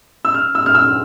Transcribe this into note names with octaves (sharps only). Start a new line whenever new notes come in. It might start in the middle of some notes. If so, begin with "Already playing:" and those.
E6
F6
E6
F6
E6